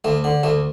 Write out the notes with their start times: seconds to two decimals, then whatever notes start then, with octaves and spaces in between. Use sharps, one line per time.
0.04 D2 A3
0.24 D3
0.43 D2 A3